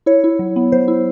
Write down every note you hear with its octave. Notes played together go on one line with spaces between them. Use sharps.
E4 C#5
E4
F#3
B3
F#3 C5
E4